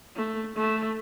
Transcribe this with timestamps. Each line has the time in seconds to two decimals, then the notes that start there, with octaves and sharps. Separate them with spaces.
0.15 A3
0.55 A3